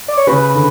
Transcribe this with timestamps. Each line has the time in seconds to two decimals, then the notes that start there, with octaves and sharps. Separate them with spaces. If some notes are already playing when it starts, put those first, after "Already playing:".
0.08 D5
0.17 C#5
0.27 C#3 B4
0.55 D3